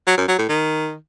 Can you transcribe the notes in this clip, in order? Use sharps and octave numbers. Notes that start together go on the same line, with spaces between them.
F#3
F#2
F#3
A2
D#3